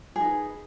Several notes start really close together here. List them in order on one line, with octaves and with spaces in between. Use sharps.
G#4 D#4 B4